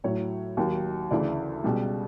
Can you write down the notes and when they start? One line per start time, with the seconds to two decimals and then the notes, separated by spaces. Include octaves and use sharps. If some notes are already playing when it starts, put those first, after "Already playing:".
0.04 A2 F#3 C#5
0.57 D#2 D#3 F#3
1.11 D2 C#3 E3 D5
1.64 C#2 B2 G3